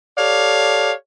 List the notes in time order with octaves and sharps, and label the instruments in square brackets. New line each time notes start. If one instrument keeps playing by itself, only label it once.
[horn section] G4 A4 C#5 D5 F5